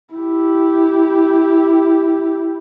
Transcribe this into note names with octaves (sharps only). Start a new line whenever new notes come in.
E4 G4